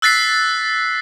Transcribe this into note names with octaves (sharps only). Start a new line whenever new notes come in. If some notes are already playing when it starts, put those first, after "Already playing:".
E6 F#6 A6 B6 C7